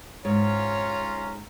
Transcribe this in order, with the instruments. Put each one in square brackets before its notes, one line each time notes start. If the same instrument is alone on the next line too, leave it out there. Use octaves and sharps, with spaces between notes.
[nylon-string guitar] G#2 [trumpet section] C#4 F4 A#5 [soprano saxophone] C#5